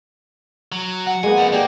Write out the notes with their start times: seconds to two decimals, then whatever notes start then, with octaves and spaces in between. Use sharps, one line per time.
0.72 F#3
1.07 F#5
1.24 G#3 A#3 B3 G#5
1.37 F2 G3
1.52 A#3 D4 G4